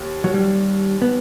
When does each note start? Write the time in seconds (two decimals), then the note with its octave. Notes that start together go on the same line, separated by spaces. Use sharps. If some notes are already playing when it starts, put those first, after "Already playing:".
Already playing: D#2
0.24 F#3
0.34 G3
1.02 B3